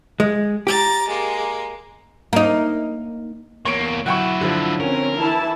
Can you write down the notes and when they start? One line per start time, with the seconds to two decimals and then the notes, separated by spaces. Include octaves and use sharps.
0.20 G#3
0.67 G4 A#5 A6
1.08 G#3 A#3
2.33 A#3 D#4
3.65 E2 A#3 C#5 C#6 D7
4.06 F#3 E4 F#5 G5 C#6
4.41 D3 F3
4.80 C4 C#4 A#4
5.19 E3 E4 A5